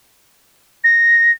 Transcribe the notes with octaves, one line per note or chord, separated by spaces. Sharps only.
A#6